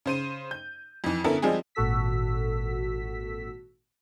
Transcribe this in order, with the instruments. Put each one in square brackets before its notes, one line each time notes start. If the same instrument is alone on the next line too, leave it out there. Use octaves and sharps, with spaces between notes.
[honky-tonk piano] C#3 C5 D#7
G6
F2 E3
D3 B3 C#4 E4 A4 A#4
F3 G3 G#3 C4 G#4
[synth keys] G#1 A#2 F#4 A4 E6 B6